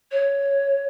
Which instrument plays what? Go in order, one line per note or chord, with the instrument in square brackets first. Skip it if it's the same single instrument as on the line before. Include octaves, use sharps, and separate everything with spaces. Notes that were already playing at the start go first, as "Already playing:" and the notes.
[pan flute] C#5